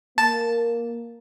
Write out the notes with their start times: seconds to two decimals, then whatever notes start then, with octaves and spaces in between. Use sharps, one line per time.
0.18 A#3 A5